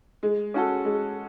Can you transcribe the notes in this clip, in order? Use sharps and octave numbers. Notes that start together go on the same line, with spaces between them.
G#3
C#4 F#4 A4
G#3